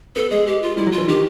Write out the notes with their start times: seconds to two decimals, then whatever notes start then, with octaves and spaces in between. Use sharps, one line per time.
0.16 B3 A4
0.30 G#3 G#4
0.47 G4
0.62 F4
0.77 G3 E4
0.86 F#3
0.92 F4
0.98 E3
1.08 D#3 G4